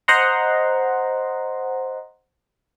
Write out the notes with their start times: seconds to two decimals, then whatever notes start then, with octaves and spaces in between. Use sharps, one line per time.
0.08 C5 D#5 F#5 A#5 C6